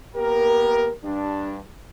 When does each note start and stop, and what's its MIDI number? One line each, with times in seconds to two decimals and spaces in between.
0.15 0.91 58
0.15 0.91 59
0.15 0.91 67
0.15 0.91 70
1.04 1.59 43
1.04 1.59 62